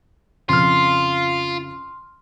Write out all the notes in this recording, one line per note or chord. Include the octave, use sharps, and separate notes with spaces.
F2 C#3 F3 F4 C6 F6